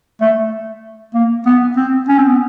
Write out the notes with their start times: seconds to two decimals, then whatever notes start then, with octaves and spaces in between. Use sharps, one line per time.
0.21 A3
1.14 A#3
1.46 B3
1.76 C4
2.08 C#4
2.18 C4
2.28 B3